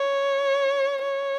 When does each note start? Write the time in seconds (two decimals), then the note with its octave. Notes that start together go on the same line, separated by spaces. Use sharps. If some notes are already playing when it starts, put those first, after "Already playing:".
Already playing: C#5
1.02 C#5